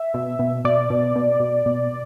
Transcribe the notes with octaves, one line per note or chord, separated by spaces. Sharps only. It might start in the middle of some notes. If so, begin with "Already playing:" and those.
Already playing: E5
B2
B2
B2 D5
B2
B2
B2
B2